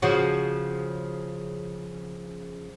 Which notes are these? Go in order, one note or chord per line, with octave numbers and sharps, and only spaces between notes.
C#3 F3 F#4